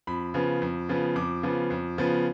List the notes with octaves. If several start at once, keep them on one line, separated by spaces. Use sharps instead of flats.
F2 B5
C#3 F3 B3
F2
C#3 F3 B3
F2 D6
C#3 F3 B3
F2
C#3 F3 B3